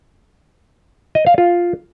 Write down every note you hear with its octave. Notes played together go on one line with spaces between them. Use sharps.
D#5
F5
F4